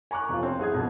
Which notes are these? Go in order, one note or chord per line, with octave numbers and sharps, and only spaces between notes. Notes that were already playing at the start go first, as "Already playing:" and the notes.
G#5 A#5 C#6 D6 F#6
F1 F4
C4
C2 G#4 D#6 G#6
F2 B2 D3